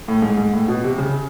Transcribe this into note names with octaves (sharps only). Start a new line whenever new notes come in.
A2
G#2
G#2
A2
B2
C3
C#3